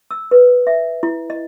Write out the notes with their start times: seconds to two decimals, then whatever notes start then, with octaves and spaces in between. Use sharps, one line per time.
0.11 E6
0.31 B4
0.67 E5
1.03 E4
1.30 D#5